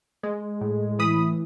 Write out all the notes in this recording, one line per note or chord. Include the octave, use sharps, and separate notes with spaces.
G#3
A2
E3 B5 D#6